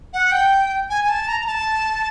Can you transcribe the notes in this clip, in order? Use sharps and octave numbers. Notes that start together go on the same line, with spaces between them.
F#5
G5
G#5
G#5
A5
A#5
A#5
A5